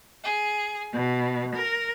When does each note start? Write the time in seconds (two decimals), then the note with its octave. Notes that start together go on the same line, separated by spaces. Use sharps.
0.23 G#4
0.93 B2
1.55 A#4